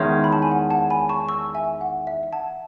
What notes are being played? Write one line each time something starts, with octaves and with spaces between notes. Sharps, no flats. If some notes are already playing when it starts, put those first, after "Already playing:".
Already playing: E2 D#3 G#3 C#4 E5
B5
A5
G#5
F#5
F#5 A5
G#5 B5
A5 C#6
C#6 E6
E5 G#5
F#5
E5
F#5 A5